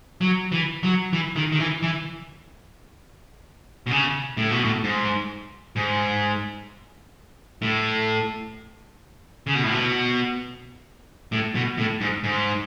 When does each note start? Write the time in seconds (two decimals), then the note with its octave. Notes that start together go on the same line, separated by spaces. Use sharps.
0.21 F#3
0.52 E3
0.83 F#3
1.13 E3
1.36 D#3
1.52 D#3
1.60 E3
1.82 E3
3.87 B2
3.91 C#3
4.37 A2
4.51 B2
4.64 A2
4.84 G#2
5.76 G#2
7.62 A2
9.47 C#3
9.54 B2
9.64 A2
9.72 B2
11.32 A2
11.55 B2
11.78 A2
12.01 G#2
12.24 G#2